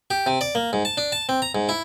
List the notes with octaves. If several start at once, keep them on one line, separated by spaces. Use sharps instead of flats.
G4
C3
D5
A#3
G#2
A5
D4
A5
C4
A#5
G#2
E4